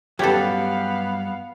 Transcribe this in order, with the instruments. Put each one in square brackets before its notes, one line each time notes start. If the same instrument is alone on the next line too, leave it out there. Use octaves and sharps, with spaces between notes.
[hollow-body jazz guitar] G2 F#3 [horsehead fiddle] B3 F5 [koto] C#4 A4 [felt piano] G4 B4